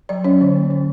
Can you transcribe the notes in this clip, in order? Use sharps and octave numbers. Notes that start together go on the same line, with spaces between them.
F#3 D5
C#4 C#5
D3
A#3
D3